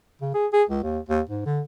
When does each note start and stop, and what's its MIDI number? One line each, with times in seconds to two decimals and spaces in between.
0.21 0.32 49
0.34 0.47 68
0.53 0.64 68
0.69 0.82 37
0.83 0.99 39
1.08 1.22 39
1.29 1.44 44
1.46 1.61 50